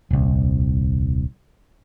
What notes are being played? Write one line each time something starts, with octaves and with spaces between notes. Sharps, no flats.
D#1 C2